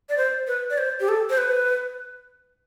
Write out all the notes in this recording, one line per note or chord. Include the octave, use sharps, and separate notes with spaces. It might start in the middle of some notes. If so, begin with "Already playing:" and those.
D5
C5
B4
D5
C5
G4
A4
C5
B4